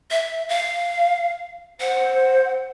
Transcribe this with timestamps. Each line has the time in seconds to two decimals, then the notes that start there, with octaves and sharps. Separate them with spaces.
0.11 E5
0.49 F5
1.80 C5 F#5